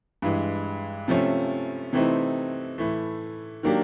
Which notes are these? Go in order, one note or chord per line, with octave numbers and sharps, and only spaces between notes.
G2 E3 G#3
C3 F3 A3 C#4
C3 E3 A3 C4 D#4
A2 E3 A3
D#3 F#3 A#3 D4 G4